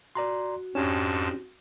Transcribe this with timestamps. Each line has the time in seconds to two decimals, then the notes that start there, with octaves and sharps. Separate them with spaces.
0.15 F#4 D5 A#5 C6
0.75 F2 G#2 C#4 D4 G4 A5